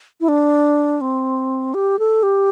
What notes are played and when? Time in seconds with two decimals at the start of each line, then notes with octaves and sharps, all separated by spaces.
0.21 E4
0.28 D4
1.01 C4
1.74 G4
1.99 A4
2.23 G4